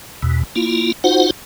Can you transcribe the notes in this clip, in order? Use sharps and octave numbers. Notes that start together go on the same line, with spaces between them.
E2 B2
A#3 E4 F4
D#4 F4 F#4 C5 F#5